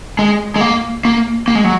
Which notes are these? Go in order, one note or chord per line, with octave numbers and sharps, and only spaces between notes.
G#3
G#3
A#3
A#3
A#3
G#3
F#3